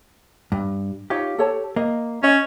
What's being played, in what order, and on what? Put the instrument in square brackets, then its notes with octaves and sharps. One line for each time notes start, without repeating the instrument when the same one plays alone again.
[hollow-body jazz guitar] G2
[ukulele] D#4 F4 C#5 [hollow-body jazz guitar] G4
[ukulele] A4 C#5 A5
[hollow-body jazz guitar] A#3 [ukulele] D#5
[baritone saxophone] C#4 [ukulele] D#5